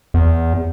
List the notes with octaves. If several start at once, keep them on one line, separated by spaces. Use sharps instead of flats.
E2